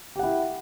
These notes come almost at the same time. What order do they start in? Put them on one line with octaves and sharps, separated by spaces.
G4 F#5 E4